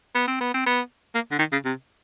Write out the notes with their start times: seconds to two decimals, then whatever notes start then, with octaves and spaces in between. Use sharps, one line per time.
0.15 B3
0.28 C4
0.41 B3
0.54 C4
0.67 B3
1.15 A#3
1.31 D3
1.39 D#3
1.52 C#3
1.65 C3